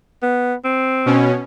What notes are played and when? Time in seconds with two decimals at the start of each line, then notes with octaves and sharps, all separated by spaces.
0.22 B3
0.64 C4
1.06 B2 C#4